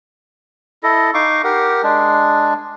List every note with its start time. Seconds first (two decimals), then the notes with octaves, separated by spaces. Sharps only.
0.83 E4 A4 D#5
1.14 D#4 F5 C#6 D6
1.44 G4 A#4 F#5
1.83 G#3 D4